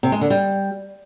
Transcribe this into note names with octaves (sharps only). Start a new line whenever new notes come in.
C3
G#3
D3
G3